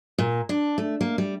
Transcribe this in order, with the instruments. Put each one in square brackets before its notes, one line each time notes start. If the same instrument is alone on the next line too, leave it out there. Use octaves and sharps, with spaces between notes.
[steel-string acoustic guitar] A#2
D4
A3
A#3
G3